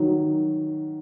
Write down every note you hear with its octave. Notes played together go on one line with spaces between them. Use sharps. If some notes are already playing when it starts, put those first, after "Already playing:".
Already playing: D#3 F#3